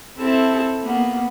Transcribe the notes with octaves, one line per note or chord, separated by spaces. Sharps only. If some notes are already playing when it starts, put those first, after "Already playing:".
C4 E4 A4
A#3 B3